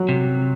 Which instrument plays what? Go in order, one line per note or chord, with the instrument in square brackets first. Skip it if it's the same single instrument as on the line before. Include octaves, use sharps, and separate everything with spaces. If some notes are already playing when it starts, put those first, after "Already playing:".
Already playing: [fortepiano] F#3
[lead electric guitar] C3